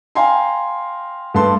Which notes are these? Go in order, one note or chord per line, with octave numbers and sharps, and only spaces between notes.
F5 G5 G#5 A#5 C6
G2 A3 B4 A5 C6